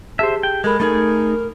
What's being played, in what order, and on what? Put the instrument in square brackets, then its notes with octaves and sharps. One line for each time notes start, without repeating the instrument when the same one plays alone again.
[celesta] G4 G#4 A5 [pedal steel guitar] C5 E5
[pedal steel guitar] G5
[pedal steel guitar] G#3 [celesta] A4 B5 [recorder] A#4
[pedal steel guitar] A3 D#4 G#4 [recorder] A#4